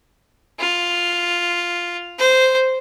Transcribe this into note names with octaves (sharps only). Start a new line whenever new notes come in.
F4
C5